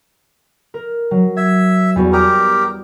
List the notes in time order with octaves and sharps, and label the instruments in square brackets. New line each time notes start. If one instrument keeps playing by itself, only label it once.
[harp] A#4
F#3
[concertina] E5 [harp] G#6
[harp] E2 G3 F#4
[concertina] G4 A#4 [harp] A#5 D#6 G6